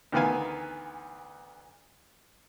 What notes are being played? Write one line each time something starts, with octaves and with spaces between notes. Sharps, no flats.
D2 D#3 E3 B3 F5 G#5